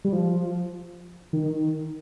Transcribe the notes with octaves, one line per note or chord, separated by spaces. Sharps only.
G3
F3
D#3